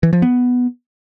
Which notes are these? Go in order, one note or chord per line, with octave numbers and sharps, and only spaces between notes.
E3
F3
B3